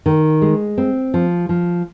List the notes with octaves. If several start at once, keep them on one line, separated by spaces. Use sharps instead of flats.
D#3
G#3
C4
F3
F3